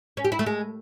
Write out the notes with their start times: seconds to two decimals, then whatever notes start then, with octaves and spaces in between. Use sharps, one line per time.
0.17 C#4
0.25 G4
0.32 E4
0.39 A3
0.46 G#3